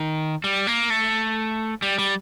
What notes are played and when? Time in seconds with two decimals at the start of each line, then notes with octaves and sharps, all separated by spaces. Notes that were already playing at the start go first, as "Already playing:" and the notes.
Already playing: D#3
0.44 G3
0.67 A#3
0.90 A3
1.82 G3
1.98 G3